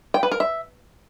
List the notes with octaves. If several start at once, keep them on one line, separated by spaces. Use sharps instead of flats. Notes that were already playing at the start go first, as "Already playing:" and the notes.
G5
B4
A#4
E5